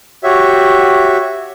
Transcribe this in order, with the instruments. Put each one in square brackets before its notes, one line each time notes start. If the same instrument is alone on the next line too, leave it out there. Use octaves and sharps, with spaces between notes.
[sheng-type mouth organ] F#4 G4 C#5 E5